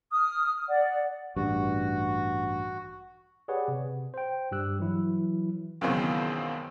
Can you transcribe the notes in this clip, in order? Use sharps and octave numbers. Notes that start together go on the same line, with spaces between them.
D#6 F6
D5 F#5
A1 G2 F#4
G4 G#4 B4 C#5 D5 F#5
C3
C5 G5
G2 G3 G4 E6 F#6
E3 F#3 E4
C#2 F#2 B2 D#3 E3 C4